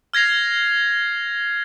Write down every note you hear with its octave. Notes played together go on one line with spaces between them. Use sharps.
F6 G#6 A#6 C7 F7